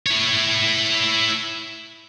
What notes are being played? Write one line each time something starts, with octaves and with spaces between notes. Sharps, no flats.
E4 C#5